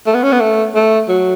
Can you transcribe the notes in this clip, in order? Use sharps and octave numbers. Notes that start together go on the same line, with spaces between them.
A3
B3
C#4
B3
A3
A3
F#3